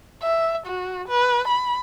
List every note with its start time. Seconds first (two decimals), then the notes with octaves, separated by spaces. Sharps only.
0.22 E5
0.66 F#4
1.09 B4
1.48 B5